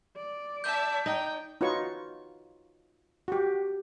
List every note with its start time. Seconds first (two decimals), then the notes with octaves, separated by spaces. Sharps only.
0.17 D5
0.64 E5 A5 G6
1.06 D#4 G5
1.61 D#4 F4 F#4 B4 C#5 C#6
3.28 F#4 G4